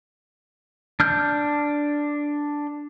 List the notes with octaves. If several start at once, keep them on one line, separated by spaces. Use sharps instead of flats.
D4 F6 G6